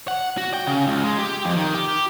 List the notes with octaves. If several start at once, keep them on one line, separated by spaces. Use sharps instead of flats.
F#5
F#4
G5
C#3
C#2
G#3
G4
F2
D#3
G4